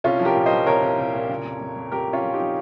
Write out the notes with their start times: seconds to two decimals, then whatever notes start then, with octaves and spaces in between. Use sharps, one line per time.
0.04 C2 C#4 F4
0.20 F3
0.25 G4 A#4
0.35 A#2
0.46 C5 D#5
0.52 F3
0.67 C2 A#4 C#5
0.82 C2
0.99 C2
1.14 A#2
1.29 C#3
1.45 F2
1.61 F2
1.76 F2
1.92 F2 G4 A#4
2.08 F2
2.13 C#4 F4
2.23 F3
2.34 D#4 G4
2.39 F3